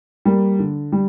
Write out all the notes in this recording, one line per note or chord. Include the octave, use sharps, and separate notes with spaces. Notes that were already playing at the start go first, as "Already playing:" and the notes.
G3 A#3
D3
G3